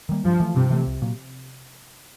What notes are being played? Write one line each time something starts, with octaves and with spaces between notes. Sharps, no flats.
D#3 G3 A#3
G2 F3
E3 A3
G2 C3
E3 A3
C2
A#2 F#3